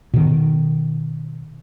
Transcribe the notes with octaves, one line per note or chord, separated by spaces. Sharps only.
B2 D#3